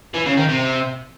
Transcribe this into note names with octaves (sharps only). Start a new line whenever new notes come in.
E3
C#3
D#3
C3